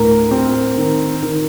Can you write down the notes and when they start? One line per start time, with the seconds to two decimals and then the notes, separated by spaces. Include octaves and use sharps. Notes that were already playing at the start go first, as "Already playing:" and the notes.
Already playing: D2 A2 A#4
0.31 C4
0.77 D#3
1.23 D#3